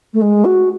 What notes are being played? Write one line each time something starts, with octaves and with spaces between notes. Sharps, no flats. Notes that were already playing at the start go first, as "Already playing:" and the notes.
A3
G#3
F#4